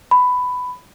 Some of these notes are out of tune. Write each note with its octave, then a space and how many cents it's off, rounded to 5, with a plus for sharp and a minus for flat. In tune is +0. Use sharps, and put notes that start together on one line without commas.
B5 +10